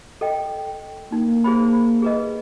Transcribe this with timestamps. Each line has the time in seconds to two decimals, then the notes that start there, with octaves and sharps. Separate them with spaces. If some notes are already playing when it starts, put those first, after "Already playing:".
0.21 A4 D#5 G5
1.12 A#3 D#4
1.44 G#4 C5 B5
2.02 G#4 B4 D#5